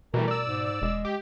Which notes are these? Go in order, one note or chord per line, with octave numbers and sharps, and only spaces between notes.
B2 E3 G3 A3 A#4
D5 E6
G#2
E1 G#3
G4